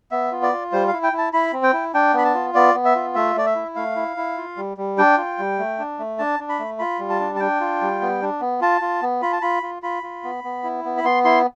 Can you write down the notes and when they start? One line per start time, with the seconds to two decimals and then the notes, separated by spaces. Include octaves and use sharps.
0.11 B3 E5
0.32 F4
0.42 D5
0.52 F4
0.72 G3 C5
0.88 F5
0.93 E4
1.03 G5
1.13 E4
1.18 A5
1.33 E4 B5
1.53 C4
1.63 G5
1.73 E4
1.94 D4 G5
2.14 B3 B5
2.25 A5
2.34 F4
2.55 B3 D5
2.74 B3
2.85 E5
2.95 F4
3.15 A3 E5
3.36 A3 D5
3.46 E5
3.55 E4
3.76 A3 F5
3.96 E4
4.17 E4
4.37 F4
4.57 G3
4.77 G3
4.98 D4 G5
5.17 F4
5.38 G3
5.58 A3
5.79 D4
5.99 A3
6.19 D4 A5
6.40 D4
6.49 B5
6.59 A3
6.79 F4 B5
6.99 G3
7.10 A5
7.20 D4
7.36 A5
7.40 D4 G5
7.60 F4
7.81 G3
8.02 B3
8.22 D4
8.41 B3
8.61 F4 A5
8.81 F4
9.02 B3
9.22 F4 B5
9.33 A5
9.42 F4 B5
9.63 F4
9.83 F4 B5
10.03 F4
10.24 B3
10.44 B3
10.64 E4
10.85 B3
10.98 B5
11.04 B3 C6
11.25 E4 C6